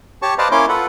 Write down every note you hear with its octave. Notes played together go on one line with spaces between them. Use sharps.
G4 C#5 A5 C#6
B4 C5 D5 D#5 F5 A5
A#3 C#4 E4 C#5 C6 D6
F4 A4 B4 F#5